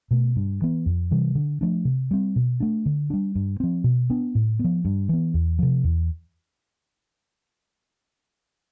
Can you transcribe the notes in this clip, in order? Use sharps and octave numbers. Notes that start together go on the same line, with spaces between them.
B2 A3
G2
E3 B3
F2
C3 E3 G3
D3
F3 A3 D4
C3
G3 C4
B2
A3 D4
D3
G3 D4
G2
F3 C4
B2
B3 D4
A2
F3 B3
G2
E3 B3
E2
C3 F3
E2